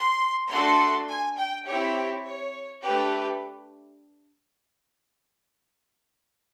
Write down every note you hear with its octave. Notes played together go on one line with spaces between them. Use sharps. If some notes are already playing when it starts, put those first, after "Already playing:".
Already playing: C6
A3 D4 F#4 A4 C6
G#5
G5
C4 E4 G4 C#5
C#5
A3 D4 G4 B4